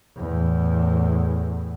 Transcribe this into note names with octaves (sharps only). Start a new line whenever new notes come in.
E2 A2